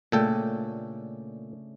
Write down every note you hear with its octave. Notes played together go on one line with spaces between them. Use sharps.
A#2 C#3 A3 D4 A4 G5